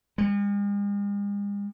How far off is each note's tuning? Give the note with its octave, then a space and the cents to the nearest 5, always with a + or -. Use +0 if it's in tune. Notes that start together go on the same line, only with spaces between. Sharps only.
G#3 -45